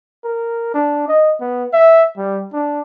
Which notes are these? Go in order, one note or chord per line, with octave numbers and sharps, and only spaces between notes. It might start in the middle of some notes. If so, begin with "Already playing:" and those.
A#4
D4
D#5
B3
E5
G3
D4